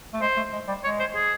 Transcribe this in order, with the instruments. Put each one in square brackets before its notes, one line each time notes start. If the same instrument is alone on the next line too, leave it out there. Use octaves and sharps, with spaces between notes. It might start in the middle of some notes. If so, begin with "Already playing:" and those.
[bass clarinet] A3
[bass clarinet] G#3 [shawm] C5
[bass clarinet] A3
G#3
G3
[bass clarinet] G#3 [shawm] C#5
[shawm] C5
G#4